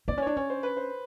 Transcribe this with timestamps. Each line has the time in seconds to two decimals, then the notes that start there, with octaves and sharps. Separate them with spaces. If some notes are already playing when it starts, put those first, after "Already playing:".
0.08 C4 D5
0.18 C#4
0.22 D4 C#5
0.37 C#4 C#5
0.50 C5
0.63 B4
0.77 C5